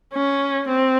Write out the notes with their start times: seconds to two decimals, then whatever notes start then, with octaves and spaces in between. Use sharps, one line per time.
0.14 C#4
0.69 C4